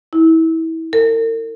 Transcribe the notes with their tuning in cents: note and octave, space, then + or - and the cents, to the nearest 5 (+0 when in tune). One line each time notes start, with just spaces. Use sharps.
E4 -25
A#4 -45